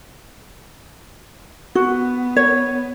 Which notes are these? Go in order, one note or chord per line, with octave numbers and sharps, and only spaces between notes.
B3 F#4
C#5